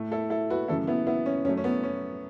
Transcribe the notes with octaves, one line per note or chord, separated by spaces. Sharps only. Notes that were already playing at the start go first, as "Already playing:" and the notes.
Already playing: A2 A3
E4 A4
E4 A4
F#4 B4
F#2 C#3 E3 A3 E4 A4
B3 E4
B3 E4
C#4
F#2 F#3 A3 C#4
C#4
B3
C#4